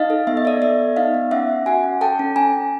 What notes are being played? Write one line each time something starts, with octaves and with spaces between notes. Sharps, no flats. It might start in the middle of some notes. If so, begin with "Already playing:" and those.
Already playing: D#4 D#5 F5
A4
B3 E5
D#5
A4 D5 E5
B3 D5 E5
B3
D#4 D#5 F5
B3
C#4 E5 F#5
C#4
F#4 F#5 G#5
C#4
A4 G5 A5
C#4
C#4 G#5 A#5
C#4